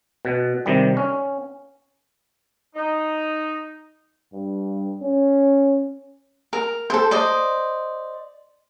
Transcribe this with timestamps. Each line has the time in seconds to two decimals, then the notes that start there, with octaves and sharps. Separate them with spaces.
0.25 B2
0.66 C3 D#3 G3
0.97 C#4
2.76 D#4
4.33 G2
5.02 C#4
6.53 A#4
6.90 A4 C5
7.11 C5 D5 D#5